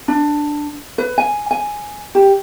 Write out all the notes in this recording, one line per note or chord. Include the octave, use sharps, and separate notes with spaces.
D4
B4
G#5
G#5
G4